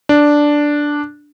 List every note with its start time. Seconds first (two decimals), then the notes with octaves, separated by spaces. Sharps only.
0.09 D4